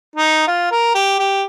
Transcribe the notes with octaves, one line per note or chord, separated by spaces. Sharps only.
D#4
F4
A#4
G4
G4